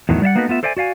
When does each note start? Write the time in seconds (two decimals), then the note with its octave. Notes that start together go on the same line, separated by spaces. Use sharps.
0.09 E2 A2 D#3 F#3
0.22 G3 D5 E5 F#5
0.35 A#3 B3 D#4 F#4 A4 B4
0.48 A3 B3 F4 E5
0.63 A4 C5 D5 E5 G5 G#5
0.77 F#4 D5 F5 G#5